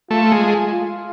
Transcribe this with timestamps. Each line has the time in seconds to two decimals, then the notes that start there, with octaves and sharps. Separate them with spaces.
0.11 A3 F4
0.32 G#3
0.74 F4